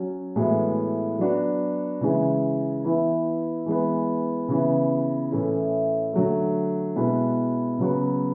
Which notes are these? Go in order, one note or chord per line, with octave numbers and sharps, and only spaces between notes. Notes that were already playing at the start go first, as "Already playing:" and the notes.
Already playing: F#3 C#4 F#4
A2 E3 G#3 B3 F#4
F#3 B3 D4 F#4
C#3 E3 G#3
E3 B3 E4
E3 G#3 B3
C#3 E3 B3
A2 E3 A3 C#4 E4
D3 F#3 A3
B2 G#3 B3 E4
C#3 F#3 B3 F#4